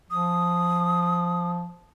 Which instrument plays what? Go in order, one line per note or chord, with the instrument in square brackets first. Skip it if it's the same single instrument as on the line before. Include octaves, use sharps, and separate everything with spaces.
[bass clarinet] F3 [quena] D#6